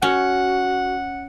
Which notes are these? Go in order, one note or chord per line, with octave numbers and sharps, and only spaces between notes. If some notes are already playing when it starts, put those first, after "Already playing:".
C#4 F#4 F#5